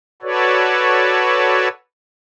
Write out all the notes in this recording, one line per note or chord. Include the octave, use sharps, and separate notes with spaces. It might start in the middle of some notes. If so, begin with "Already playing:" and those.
F#4 A4 B4 C#5 D5